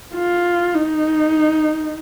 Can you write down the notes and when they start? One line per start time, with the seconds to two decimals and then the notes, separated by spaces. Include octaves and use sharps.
0.14 F4
0.75 D#4